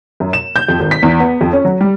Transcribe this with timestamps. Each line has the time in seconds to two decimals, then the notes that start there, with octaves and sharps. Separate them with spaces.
0.20 F#2
0.33 E7
0.56 G6
0.68 F2
0.80 G#1
0.91 B6
1.03 E2
1.20 B3
1.41 F2
1.53 C#4
1.65 F#3
1.81 G3